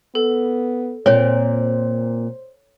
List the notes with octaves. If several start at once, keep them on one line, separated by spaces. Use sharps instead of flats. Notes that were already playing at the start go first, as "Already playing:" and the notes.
B3 A4
A#2 C4 C5 C#5